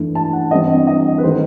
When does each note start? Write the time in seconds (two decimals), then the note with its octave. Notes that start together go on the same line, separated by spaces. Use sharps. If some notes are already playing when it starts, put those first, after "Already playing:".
Already playing: G2 E3 A3
0.15 A5
0.33 F#5
0.51 G2 E3 G3 C4 D#5
0.87 D#5
1.18 B4
1.24 D#3 A3 C5